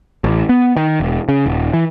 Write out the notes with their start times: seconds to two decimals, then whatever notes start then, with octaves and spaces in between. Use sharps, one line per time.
0.24 A1
0.49 B3
0.76 D#3
1.00 E1
1.29 C#3
1.46 D#1
1.73 E3